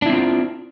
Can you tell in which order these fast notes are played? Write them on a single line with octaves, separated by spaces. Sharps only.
D4 E4 C4 F4